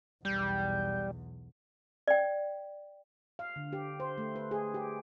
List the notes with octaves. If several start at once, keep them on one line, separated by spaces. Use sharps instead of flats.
B1 E2 G3 G6
D5 G5
F5
D3
G4
C5
A3
B4
G#4
G4